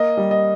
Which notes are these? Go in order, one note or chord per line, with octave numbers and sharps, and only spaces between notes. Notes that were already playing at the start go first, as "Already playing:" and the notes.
Already playing: A#3 D#5
G3
D#5